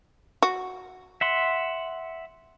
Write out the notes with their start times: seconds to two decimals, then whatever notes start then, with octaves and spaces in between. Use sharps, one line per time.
0.42 F#4
1.21 E5 F#5 C6